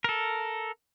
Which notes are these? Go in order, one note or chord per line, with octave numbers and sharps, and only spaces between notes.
A4 A#4